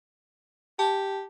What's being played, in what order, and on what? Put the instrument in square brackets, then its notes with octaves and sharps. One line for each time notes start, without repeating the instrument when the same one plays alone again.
[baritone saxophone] G4 [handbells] A5